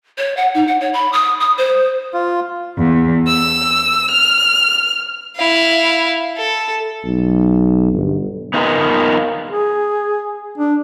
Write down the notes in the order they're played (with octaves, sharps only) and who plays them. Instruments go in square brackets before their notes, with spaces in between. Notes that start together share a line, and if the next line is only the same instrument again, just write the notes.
[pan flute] C#5
F#5
D#4
F#5
C#5
B5
D#6
D#6
C5
[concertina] F4
[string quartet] E2
E6
F6
[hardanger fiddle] E4 F5
A4
[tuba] B1
G1
[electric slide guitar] B3 D#4 F4 F#4 A#4 B4
[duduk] G#4
D4